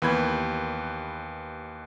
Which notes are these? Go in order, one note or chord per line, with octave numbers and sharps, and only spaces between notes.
D#2 E3 B3 B5 G6 G#6